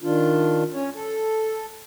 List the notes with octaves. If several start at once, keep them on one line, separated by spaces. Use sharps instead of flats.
D#3 D4 F4
C#4 C#5
A4